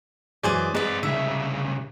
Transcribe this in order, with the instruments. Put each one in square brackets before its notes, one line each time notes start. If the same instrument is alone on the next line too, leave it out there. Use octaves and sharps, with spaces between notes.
[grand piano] F#2 E3 G#3 [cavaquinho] G#4 C5 D5
[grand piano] G#3 [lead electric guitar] C4 D#5 [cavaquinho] B4 D5
[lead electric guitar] C2 C#3 [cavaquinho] E5